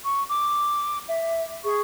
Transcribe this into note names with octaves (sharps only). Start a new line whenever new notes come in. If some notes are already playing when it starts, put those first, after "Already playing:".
C#6
D6
E5
G#4 C#6